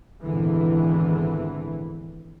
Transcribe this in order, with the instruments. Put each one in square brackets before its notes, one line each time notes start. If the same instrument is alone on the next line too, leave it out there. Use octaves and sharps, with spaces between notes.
[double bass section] G#1 E2 A#2 D3 E3